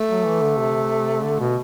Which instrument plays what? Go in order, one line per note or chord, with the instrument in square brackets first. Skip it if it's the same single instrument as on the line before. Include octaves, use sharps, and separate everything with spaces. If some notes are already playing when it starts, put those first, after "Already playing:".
Already playing: [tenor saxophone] A3
[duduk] F#3
E3
D3
C3
D3
B2